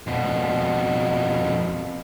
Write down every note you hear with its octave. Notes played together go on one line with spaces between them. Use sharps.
F2 B2